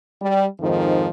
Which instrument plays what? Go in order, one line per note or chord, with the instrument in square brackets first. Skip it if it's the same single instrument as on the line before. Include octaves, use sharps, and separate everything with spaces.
[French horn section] G3
F2 G#2 D#3 F3